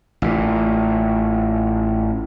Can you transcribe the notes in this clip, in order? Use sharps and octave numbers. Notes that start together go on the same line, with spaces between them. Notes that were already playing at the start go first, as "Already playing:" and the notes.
A1 A#2